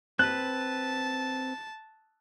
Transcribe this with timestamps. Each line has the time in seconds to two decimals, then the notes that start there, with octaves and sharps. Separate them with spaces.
0.19 C4 B4 A5 F#6